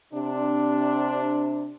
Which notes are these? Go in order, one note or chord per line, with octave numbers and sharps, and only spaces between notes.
C3 D4